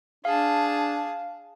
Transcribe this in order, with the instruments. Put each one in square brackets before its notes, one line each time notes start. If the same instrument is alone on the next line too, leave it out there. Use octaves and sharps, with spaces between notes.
[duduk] D4 [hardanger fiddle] G#4 A5 [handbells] F5